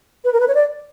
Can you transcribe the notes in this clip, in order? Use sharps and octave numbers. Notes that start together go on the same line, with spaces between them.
B4
A#4
B4
C#5
D5